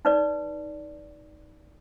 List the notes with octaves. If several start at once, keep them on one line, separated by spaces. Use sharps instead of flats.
D#4 B4 D5